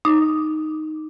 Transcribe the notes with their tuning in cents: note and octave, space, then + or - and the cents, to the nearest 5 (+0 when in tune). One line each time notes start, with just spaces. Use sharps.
D#4 +0 D6 +0